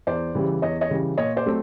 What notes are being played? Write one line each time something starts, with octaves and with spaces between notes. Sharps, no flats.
E2 C5 D5
C#3 E3 G3
E2 C#5 D#5
C#5 D#5
C#3 E3 G3
A#2 C#5 D#5
C5 D5
F#3 A3 C4